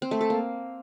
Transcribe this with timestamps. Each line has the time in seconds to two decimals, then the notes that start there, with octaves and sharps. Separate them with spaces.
0.02 C4
0.11 A3
0.21 A4
0.30 A#3